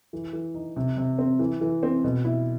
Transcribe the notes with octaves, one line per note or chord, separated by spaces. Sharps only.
E3
E3
D#4
C3
C3
C4
E3
E3
C4
B2
E4